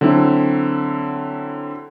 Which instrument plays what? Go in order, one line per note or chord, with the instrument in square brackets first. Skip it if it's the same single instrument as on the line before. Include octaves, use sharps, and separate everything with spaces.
[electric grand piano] D3 F#3 C4 E4